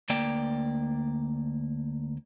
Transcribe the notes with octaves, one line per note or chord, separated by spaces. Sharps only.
D2 A#3 D5 G5